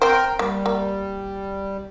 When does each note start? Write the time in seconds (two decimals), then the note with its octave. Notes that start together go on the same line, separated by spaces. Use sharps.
0.02 C4 A#4 C5 G5
0.39 G3 A#3
0.66 A#3